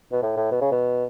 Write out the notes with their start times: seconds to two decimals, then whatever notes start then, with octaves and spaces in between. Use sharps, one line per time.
0.12 B2
0.22 A2
0.37 A2
0.51 B2
0.61 C#3
0.72 B2